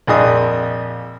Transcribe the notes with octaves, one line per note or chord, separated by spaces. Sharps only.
A#1 F2 G#4 D#5 D#6